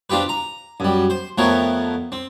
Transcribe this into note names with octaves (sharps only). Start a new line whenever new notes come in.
C4 D4 F4 G4 B4
A#5
F#2 G3
C5
F2 A3 B3 C4 A#4 C#5
C4